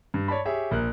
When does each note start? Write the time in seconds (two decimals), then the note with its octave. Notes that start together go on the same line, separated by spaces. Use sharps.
0.14 G2
0.28 C#5 D5 A5 B5
0.46 G4 G#4 C#5 E5
0.71 A#1 A#4 F#6